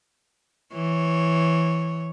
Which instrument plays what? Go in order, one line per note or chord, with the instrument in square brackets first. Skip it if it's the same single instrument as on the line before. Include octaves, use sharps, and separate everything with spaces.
[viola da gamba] E3 C#5